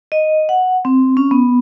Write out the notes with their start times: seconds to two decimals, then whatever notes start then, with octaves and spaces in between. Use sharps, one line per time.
0.12 D#5
0.49 F#5
0.85 C4
1.17 C#4
1.31 B3